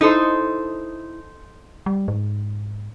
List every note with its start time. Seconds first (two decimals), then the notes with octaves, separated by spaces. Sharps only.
0.01 D#4 E4 A4 C5
1.86 G3
2.08 G#2